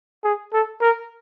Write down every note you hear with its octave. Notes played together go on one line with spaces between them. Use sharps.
G#4
A4
A#4